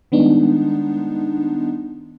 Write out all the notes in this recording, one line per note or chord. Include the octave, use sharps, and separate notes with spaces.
D#3 G3 G#3 B3 D4 D#4